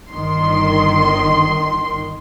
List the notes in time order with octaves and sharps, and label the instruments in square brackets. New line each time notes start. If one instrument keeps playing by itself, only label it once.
[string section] G1 D#3 C6